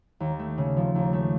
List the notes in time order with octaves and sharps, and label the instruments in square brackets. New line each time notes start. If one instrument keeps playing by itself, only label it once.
[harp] D#2
A3
C#3
F3
D#2
A3